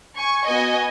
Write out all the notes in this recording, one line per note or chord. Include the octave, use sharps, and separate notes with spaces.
G#5 C#6
B3 F#4 D#5 G#5